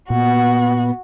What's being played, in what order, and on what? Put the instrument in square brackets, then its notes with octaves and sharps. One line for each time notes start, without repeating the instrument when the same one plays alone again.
[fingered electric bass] A#2 [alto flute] B3 [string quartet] F#4